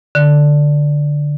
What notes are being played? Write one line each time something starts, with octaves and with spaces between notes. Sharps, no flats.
D3